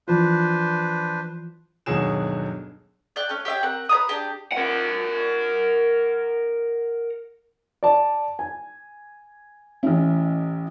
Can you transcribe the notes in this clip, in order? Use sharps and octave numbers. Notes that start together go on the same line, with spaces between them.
E3 F3 D4 F4 B4 C5
G1 D#2 B2 F#3 G#4 E7
D5 G5 F#6
A3 C#4
G4 C#5 E5 G5
C4 A#4 F#5
B4 D5 A#5 D#6
D4 G4 G#4
A#4 F#5
D5 A5
G#5
A1 C#4 E4